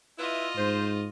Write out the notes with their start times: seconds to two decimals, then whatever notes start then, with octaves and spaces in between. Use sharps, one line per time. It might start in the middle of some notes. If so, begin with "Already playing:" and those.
0.18 E4 F4 B4 D#5 E5
0.57 G#2 C5